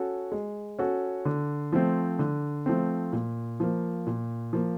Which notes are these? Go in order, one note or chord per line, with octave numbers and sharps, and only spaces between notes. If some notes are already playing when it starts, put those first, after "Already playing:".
Already playing: C#4 F#4 A4
G#3
C#4 F#4 A4
D3
F3 A3 C4
D3
F3 A3 C4
A#2
F3 A#3
A#2
F3 A#3